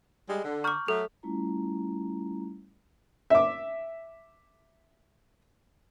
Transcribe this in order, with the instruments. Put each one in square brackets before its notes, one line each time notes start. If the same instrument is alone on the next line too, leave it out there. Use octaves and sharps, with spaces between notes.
[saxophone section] G3 G#3
D3
[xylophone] A#5 D6 [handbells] C#6 F6 G6
[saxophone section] F#3 A3 [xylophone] A4
[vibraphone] G3 A3 C#4 E4 F4 A#5
[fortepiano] E5 D6